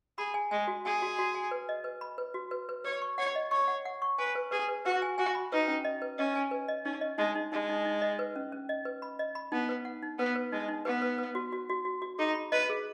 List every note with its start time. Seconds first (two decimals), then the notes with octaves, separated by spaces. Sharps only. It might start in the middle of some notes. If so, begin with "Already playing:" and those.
0.18 G#4 B5
0.34 G#5
0.51 G#3 G#5
0.67 F#4
0.85 G#4 G#5
1.02 F#4
1.19 F#4
1.35 G#5
1.51 B4
1.69 D#5
1.84 B4
2.01 B5
2.18 B4
2.34 F#4
2.51 B4
2.69 B4
2.84 B4 C#5
3.02 C#6
3.18 C#5 F#5
3.36 D#5
3.51 C#5 C#6
3.68 F#5
3.85 F#5
4.02 C#6
4.18 B4 G#5
4.35 B4
4.51 G#4 B4
4.69 B4
4.85 F#4 B4
5.02 G#5
5.18 F#4 G#5
5.35 B5
5.51 D#4 B4
5.68 C#4
5.85 D#5
6.02 B4
6.18 C#4 D#5
6.35 G#5
6.51 B4
6.68 D#5
6.85 C#4 D#4
7.01 D#5
7.18 G#3 D#4
7.35 D#4
7.52 G#3 D#4
7.69 D#4
7.85 D#4
8.02 D#5
8.19 B4
8.36 C#4
8.52 C#4
8.69 D#5
8.85 B4
9.02 B5
9.19 D#5
9.35 B5
9.52 B3 D#4
9.69 B4
9.85 F#5
10.03 D#4
10.19 B3 B4
10.36 B4
10.52 G#3 D#4
10.68 D#4
10.85 B3 B4
11.02 B4
11.18 B4
11.35 F#4
11.53 F#4
11.70 F#4
11.85 F#4
12.02 F#4
12.19 D#4 G#4
12.35 B5
12.52 B4 D#5
12.70 G#4